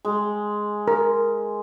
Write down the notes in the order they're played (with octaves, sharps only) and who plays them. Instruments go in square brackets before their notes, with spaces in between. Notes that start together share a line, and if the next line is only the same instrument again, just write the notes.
[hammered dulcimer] G#3
[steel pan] A#4